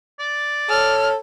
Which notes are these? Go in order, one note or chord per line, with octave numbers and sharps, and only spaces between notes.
D5
A4 C#5 F6